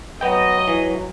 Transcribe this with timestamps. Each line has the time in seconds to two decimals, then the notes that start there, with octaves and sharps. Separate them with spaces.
0.21 F#3 B3 D#5 G5
0.68 E3